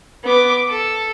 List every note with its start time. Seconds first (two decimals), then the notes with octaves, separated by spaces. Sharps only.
0.24 B3 D6
0.68 A4